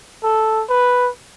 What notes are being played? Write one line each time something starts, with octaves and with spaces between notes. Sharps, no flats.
A4
B4